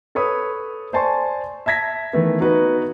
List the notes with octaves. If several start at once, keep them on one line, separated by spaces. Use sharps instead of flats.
A4 B4 C#5 B5 D#6
C5 D5 G#5 A5 C6 C#6
E5 A5 G#6 A#6 B6
D#3 E3 A3 B3
B3 D#4 F#4 B4